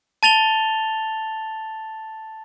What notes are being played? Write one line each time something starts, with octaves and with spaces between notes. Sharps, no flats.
A5 A6 F7 G7